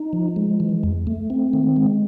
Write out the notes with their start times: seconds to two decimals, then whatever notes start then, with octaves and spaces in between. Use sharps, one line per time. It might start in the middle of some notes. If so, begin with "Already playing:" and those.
Already playing: D#4
0.13 F3
0.36 G#3
0.60 E3
0.83 F2
1.07 A3
1.30 C4
1.53 D#3
1.76 G#3